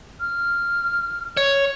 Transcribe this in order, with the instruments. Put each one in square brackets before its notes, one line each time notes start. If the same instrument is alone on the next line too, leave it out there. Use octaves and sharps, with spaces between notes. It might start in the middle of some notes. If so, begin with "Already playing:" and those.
[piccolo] F6
[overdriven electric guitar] C#5